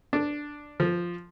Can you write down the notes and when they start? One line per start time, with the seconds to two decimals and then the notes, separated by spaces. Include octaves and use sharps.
0.13 D4
0.80 F3